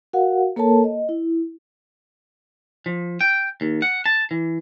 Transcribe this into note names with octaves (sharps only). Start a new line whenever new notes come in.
F#4 A#4 F5 F#5
A#3 A4 A#4 C#5 A5
D#5
E4
F3
G5
D#2
F#5
A5
E3